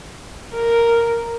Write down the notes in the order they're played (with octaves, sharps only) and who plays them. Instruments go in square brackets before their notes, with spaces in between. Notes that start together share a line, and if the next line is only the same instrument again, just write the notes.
[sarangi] A#4